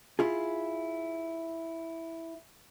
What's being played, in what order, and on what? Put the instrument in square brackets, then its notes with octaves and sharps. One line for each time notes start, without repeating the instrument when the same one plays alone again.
[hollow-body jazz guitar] E4 F4 G#4